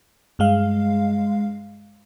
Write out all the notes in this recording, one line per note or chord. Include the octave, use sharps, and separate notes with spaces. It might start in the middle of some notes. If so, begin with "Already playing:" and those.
G2 G#3 F5